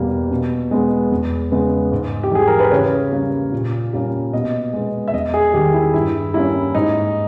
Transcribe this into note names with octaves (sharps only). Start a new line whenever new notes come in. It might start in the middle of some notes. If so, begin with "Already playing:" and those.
Already playing: E2 B2 G3 A#3
B2
G#3 B3
E2
C#3 G#3 B3
G#2
G4
E3 G3 G#4
A#4
B4
C#3 C#5
G3 A#3 C#4
A#2
G3 A#3 C#4
B2 D#5
G#3 B3
E5
E2 D#5
G#4
D#3 G3 G4
E4
G2 E4
G3 A#3 C#4 E4
G#2 D#4